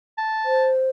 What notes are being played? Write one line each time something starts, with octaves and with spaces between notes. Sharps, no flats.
A5
C5